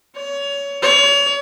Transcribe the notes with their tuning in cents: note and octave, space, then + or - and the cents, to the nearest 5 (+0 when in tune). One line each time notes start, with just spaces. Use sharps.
C#5 +25
C#5 +35